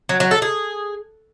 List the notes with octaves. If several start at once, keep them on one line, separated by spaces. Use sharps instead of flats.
F#3
F#3
A4
G#4